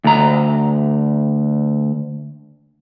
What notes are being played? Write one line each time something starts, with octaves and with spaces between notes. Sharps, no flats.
D2 A#5